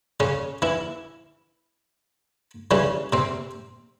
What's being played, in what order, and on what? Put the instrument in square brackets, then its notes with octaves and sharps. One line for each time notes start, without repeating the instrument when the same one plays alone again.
[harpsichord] C#3 C#4
E3 E4
C#3 E3 G3 C#4
C3 C4